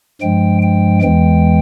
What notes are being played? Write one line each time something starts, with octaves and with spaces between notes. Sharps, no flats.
G2 F3 G#3 G5
G5
E2 E3 G#3 G5